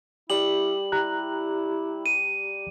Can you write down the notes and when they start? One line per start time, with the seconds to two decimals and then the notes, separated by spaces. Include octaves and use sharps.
0.30 G3 E4 F#7
0.92 E4 G4 A#5 F#6
2.06 D#7